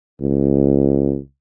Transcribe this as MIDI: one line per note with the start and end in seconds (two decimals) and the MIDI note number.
0.21 1.18 37